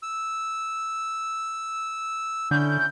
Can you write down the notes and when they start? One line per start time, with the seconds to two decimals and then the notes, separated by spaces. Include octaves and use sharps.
0.03 E6
2.51 D3 C#4 E4 G6